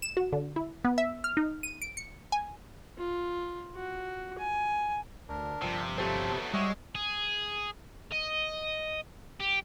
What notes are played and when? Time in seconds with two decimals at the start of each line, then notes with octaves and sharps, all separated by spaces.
0.02 E7
0.17 F#4
0.33 D3
0.56 E4
0.85 B3
0.98 E5
1.24 F6
1.37 D#4
1.63 D#7
1.82 D7
1.97 C#7
2.32 G#5
2.98 F4
3.75 F#4
4.38 G#5
5.29 D2 D4 A#4
5.62 G1 G2 C3 F3
5.98 F#3 A3 C4 G4 A4 C5
6.31 B3
6.54 G#2 G3 G#3 F#4 C#5 D#5 E5
6.95 G#4
8.12 D#5
9.40 G4